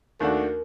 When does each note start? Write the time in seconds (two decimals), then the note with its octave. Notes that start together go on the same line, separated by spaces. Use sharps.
0.20 D#2 D#3 A3 D4 F#4 A#4